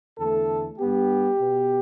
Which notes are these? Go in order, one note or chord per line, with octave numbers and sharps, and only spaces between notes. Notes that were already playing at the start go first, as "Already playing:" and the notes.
E2 D3 A3 A4
G2 G3 B3 G4
B2 B3